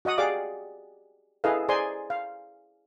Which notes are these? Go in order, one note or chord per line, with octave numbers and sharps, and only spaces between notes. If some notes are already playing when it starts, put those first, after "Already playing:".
F#4 D#5 F#5 D#6
G4 G#4 D5 F5 D6
E4 G#4 A4 B4 D#5 F5
G#4 C5 D5 G#5 A#5 C6
F5